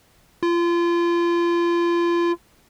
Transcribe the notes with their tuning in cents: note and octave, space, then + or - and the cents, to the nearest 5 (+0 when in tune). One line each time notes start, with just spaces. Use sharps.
F4 -30